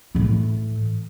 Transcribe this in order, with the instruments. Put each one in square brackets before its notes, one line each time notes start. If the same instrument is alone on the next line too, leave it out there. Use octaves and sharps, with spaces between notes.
[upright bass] A2 E3